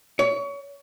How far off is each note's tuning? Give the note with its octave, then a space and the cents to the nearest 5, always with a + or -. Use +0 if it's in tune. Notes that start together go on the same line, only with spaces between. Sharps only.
C#5 +30